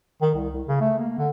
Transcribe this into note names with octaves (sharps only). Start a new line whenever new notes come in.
D#3
C2
C2
C#3
A3
A#3
D3